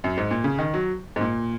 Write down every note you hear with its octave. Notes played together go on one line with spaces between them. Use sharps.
F#2
G#2
A#2
C#3
D#3
F#3
G#2
A#2